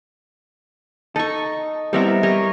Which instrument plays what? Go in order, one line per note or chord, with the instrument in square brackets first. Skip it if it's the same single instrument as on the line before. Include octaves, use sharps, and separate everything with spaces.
[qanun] D#4 C#6 [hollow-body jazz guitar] A4
[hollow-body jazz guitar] G3 C4 E4 [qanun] B3 A#4 E5
[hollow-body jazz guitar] G3 [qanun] A#4 C#5 D#5